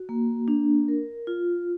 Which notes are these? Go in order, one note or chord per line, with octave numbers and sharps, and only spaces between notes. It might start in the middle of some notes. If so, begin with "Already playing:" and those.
Already playing: F#4
A#3
D4
A#4
F4